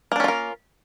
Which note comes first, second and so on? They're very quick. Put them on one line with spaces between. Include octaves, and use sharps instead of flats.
A#3 D4 C#4 F4 A#4